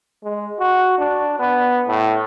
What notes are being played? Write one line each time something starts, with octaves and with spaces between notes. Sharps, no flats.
G#3
F#4
D4
B3
A2